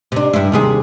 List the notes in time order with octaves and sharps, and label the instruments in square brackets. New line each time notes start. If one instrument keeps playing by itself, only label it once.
[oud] C3 D4
G2 E4
D#2 C3 G#4